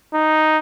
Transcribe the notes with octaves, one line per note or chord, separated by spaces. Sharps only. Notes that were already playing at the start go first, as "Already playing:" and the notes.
D#4